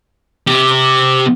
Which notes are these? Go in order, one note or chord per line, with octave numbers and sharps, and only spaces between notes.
C3 G4